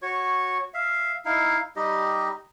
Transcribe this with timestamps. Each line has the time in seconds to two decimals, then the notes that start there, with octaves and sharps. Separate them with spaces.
0.02 F#4 C#5 C#6
0.74 E5 F5
1.25 D#4 E4 F5
1.76 G3 D#4 G4 D#5